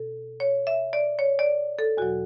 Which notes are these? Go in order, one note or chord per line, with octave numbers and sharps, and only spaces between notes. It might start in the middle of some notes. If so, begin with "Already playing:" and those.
Already playing: B2 A4
C#5
E5
D5
C#5
D5
A4
E2 B2 F#3 F#4